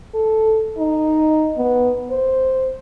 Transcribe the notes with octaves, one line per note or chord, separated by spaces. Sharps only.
A4
D#4
B3
C5